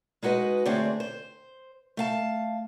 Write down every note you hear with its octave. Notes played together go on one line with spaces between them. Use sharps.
G#3 D#4 F#4 B4 D#5
D3 A3 C4 D4 G#4 C#5
C5
A3 F5 A5